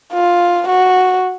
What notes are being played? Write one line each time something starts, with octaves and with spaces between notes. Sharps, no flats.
F4
F#4